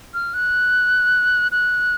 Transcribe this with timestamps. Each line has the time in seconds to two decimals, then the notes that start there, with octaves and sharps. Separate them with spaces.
0.14 F6
0.34 F#6
1.52 F#6